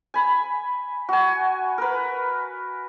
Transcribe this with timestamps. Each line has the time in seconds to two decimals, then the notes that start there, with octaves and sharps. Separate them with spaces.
0.14 G#5 B5
1.09 F#4 G#5
1.78 A#4 B4